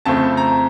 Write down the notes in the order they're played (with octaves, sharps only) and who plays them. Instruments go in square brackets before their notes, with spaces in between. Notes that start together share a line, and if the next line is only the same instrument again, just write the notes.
[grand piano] F2 C#3 A3 C4 A5
A#5